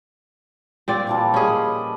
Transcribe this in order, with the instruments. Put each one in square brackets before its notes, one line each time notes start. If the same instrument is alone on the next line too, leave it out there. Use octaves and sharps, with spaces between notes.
[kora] A#2 C4 D5
[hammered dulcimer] E3 F3 G3
[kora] C#4 G#4 [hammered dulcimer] D#5 B5